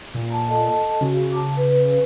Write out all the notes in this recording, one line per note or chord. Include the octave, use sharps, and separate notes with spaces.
A#2
A5 A#5
A4 D#5 A5
C#3 F#4
A5 A#5 D6
B4